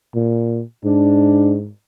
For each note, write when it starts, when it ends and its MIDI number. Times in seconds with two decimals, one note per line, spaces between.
0.15 0.62 46
0.84 1.70 44
0.84 1.54 62